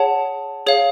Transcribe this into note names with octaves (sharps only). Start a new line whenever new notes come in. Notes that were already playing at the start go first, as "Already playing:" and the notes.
Already playing: G#4 C#5 F#5 A5
G#4 C#5 F5